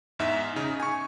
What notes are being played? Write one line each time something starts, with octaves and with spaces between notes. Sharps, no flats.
E2 G#2 D#4 E5 B6
C#3 D#4
G#5 C#6